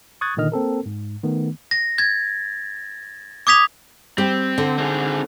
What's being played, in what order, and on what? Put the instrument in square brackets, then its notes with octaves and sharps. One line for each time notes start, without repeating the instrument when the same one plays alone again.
[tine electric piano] C#6 D#6 F#6 G#6 A6
A#2 D3 D#3 D#5 F6
A#3 C4 A4 A#4
G#2
D#3 A3 B3
[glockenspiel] A#6
G#6 A6
D6 D#6 G#6 B6 F7
[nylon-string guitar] G3 G4 [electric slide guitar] C4
[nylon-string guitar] D3
[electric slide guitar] C4 D#4 G#4